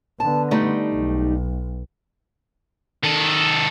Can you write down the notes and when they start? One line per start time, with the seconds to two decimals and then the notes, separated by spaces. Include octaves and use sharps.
0.20 D3 B3 A5
0.51 G3 A3 D#4
0.93 B1
3.03 D#3 A4